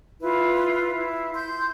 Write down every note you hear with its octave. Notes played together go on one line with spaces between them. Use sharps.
E4 F4 B4
E4
C6 G6